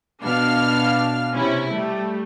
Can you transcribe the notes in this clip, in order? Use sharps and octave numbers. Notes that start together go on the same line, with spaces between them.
B2 D4 F5 F6
C3 C#4 E4
G3 A3